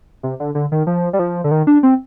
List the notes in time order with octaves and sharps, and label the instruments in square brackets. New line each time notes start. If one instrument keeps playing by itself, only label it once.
[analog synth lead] C3
D3
D3
D#3
F3
G3
F3
D3
D#3
D4
C4